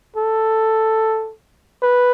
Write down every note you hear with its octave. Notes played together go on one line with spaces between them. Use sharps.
A4
B4